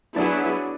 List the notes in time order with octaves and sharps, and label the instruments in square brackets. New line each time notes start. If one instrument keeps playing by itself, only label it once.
[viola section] F#3 B3 E4 G#4 [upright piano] D4 D5